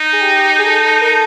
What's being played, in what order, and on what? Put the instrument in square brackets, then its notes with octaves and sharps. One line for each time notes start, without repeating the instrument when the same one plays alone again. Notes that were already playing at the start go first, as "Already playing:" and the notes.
Already playing: [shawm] D#4
[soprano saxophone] G#4
G4
G#4
A4
A#4
A4